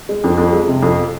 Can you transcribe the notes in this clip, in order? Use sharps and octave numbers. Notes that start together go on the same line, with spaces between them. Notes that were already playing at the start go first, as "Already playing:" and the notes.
G#3
F2
F2
G#3
C3
F2